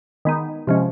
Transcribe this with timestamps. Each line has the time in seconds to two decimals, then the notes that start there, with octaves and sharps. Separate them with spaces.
0.25 D#3 G#3 B3 D#4
0.67 C3 F3 G#3 C#4